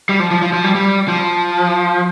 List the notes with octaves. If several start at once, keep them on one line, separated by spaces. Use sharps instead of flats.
G3
F3
F3
F3
F3
G3
G3
F3